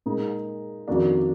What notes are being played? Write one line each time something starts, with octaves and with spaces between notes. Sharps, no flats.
A#2 G#3 D#4 A#4
F2 D#3 A#3 D4 F#4